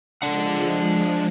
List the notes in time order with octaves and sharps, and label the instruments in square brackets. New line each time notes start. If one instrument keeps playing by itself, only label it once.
[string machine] F3 G#3 [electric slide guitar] D4 F#5